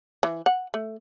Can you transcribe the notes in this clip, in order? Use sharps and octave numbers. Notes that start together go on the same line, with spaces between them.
E3
F#5
A3